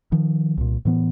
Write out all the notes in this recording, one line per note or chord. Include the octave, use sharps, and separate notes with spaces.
D#3 F3
C2 A#2
A2 E3 B3